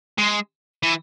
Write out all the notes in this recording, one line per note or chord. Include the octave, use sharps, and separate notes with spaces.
G#3
E3